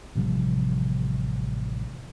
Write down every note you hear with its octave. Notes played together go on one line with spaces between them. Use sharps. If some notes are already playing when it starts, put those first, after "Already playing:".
A1 C3 F3 G3